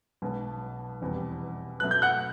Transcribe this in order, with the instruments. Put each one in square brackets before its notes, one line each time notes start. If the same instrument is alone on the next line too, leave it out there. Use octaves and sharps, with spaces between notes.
[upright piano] B1 B2 G#3
F1 E2 B2 G3
[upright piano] B2 F#3 A3 [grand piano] F#6
[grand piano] G6
F#5 F#6